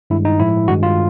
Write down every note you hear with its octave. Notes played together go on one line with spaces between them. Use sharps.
G2 D#3 G#3 E4
D#4
A2 F3 G#3 E4
G2 D#3 G#3 F#4
F4